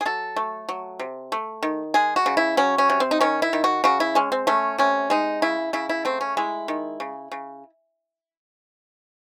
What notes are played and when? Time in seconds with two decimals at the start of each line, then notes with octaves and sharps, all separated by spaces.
0.01 G#4
0.05 F#3 A4
0.36 A3
0.69 F#3
0.99 C3
1.32 A3
1.63 D#3
1.94 G#3 G#4
2.16 F#4
2.26 C#3
2.37 E4
2.57 F#3 C#4
2.78 C#4
2.90 C3
3.00 C4
3.11 D#4
3.21 D#3 C#4
3.42 E4
3.53 D#3
3.64 F#4
3.84 C#3 F#4
4.00 E4
4.15 G#3 C#4
4.32 C4
4.47 A3 C#4
4.78 C3 C#4
5.10 G#3 D#4
5.42 C#3 E4
5.73 C#3 E4
5.89 E4
6.05 A3 C4
6.21 C#4
6.37 G#3 E4
6.68 D#3
7.00 C#3
7.32 C#3